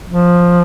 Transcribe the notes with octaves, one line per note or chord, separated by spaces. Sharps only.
F3